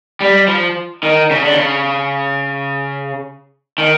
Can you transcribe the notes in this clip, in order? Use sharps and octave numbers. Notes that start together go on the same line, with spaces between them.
G3
F3
D#3
C#3
D3
C#3
D#3